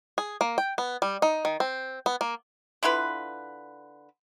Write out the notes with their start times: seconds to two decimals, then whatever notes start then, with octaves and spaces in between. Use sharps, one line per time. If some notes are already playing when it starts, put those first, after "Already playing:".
0.18 G#4
0.41 A#3
0.58 G5
0.78 B3
1.02 G3
1.22 D#4
1.45 D#3
1.60 C4
2.06 B3
2.21 A#3
2.83 D3 E4 F4 B4